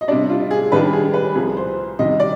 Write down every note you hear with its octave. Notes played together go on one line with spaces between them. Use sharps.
D#5
C3 G3 D4 D5
F4
G#4
G2 D#3 G3 D4 B4
G#4
B4
C2 C3 F3 G#4
C5
C3 D#3 G3 D#5
D5